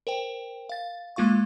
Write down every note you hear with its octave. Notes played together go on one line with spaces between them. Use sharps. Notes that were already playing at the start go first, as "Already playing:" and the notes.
A#4 C5 G5
F5 A6
G#3 A#3 F4 F5 C#6